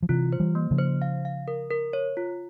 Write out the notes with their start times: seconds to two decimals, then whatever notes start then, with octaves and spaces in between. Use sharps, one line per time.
0.02 F3
0.09 C3 E3 F4
0.33 C5
0.40 E3 G3
0.55 A#3
0.71 C#3 F3
0.78 C5
1.02 F5
1.25 F5
1.48 A#4
1.70 A#4
1.93 C#5
2.17 F4